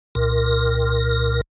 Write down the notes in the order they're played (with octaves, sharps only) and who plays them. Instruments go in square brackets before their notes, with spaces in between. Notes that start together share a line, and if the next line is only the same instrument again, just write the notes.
[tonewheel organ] C2 A#2 A#4